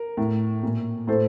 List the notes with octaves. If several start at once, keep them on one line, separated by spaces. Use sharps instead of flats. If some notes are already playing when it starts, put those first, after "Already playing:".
Already playing: A#4
A2
A#2
A2 A4 C5